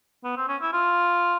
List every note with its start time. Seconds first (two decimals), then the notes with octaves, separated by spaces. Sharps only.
0.24 B3
0.37 C4
0.48 C#4
0.62 E4
0.73 F4